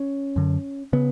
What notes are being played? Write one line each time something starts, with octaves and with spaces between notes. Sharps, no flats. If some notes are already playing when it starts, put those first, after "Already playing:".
Already playing: C#4
F#2 D3
C#3 B3